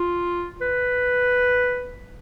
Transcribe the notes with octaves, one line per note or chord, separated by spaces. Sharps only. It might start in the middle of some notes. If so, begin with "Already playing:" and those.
Already playing: F4
B4